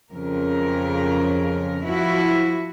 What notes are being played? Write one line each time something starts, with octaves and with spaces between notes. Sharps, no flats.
F2 C#3 A#4
F3 E4 F#4